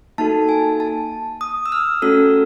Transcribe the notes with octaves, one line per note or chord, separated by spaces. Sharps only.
A#3 D#4 F#4 A4 A5
G#5
A5
D#6
E6
F6
A3 C#4 F#4 A4 E6